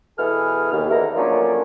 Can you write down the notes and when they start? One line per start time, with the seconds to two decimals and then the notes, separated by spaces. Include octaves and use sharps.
0.18 B2 E3 G#4 A4 F6
0.72 D#2
0.90 E2 D3 D#4 E4 A#5
1.16 F3 F#3 A3 A#3 C#4 D4